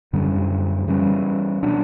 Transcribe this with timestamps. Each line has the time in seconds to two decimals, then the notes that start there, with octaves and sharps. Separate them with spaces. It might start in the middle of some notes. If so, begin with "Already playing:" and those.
0.13 F#2 D3 G3 C#4
0.88 C#3 E3 G3 C#4
1.63 B2 F#3 B3 D4